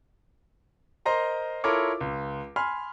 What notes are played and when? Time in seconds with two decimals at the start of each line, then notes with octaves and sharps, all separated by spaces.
1.06 A#4 C5 D#5 A#5 C6
1.64 E4 F4 A4 A#4 C#5 D6
2.01 C#2
2.56 G#5 B5 C6 F6